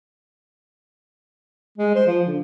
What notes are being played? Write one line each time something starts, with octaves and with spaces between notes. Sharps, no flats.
G#3
C5
F3
D3